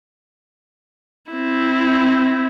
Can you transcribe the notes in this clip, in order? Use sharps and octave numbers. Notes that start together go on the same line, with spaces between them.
C4 E4